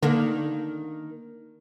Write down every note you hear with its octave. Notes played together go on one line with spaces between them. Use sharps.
D3 D#3 A#3 D4